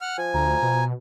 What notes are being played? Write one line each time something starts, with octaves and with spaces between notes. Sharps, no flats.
F#5 F6
F3 G#5
D2 A#5
B2